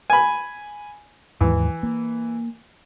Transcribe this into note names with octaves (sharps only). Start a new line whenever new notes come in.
G#5 B5
D#2 G#2 E3 F#3
A#3